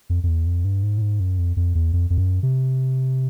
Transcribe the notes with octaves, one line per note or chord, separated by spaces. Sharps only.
F2
F2
E2
F2
G2
G#2
A2
G#2
F#2
F2
F2
E2
F2
F2
F#2
C3